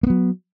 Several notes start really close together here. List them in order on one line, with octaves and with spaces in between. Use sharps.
A#3 B3 F#3